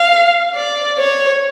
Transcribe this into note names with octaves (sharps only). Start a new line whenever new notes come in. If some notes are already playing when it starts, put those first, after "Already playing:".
Already playing: F5
D5
C#5